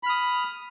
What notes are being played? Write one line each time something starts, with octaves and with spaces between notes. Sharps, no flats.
B5 D#6 F6